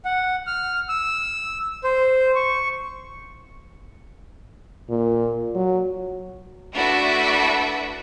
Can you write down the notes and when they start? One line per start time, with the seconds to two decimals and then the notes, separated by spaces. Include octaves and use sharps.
0.05 F#5
0.47 F6
0.89 E6
1.84 C5
2.35 C#6
4.89 A#2
5.55 F#3
6.74 A3 D4 E4 F#4 B4 E5